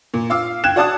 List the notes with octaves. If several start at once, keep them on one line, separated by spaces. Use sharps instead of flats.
A#2
F4 F5 D6 E6
G5 F#6 G#6 E7
F#4 D5 F#5 A5 D#6 F#6